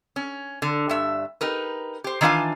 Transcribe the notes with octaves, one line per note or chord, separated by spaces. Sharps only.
C#4
D3
G2 E5
D#4 G4 A#4 B4
G4 C5
D#3 E3 D4 F4 F5 G#5